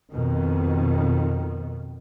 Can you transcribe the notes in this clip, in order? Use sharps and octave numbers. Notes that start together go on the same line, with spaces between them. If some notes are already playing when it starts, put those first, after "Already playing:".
F2 B2 D#3